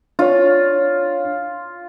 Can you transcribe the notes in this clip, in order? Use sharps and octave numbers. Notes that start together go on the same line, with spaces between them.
D4 F4 C#5